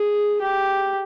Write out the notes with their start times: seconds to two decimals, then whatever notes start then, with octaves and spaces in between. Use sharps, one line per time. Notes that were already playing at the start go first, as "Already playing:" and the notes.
Already playing: G#4
0.41 G4